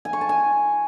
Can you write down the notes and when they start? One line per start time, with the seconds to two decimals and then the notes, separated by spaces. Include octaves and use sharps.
0.05 G#5
0.13 C#6
0.21 A5
0.29 G#5